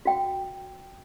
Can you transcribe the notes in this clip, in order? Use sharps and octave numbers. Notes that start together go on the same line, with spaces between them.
F#4 G5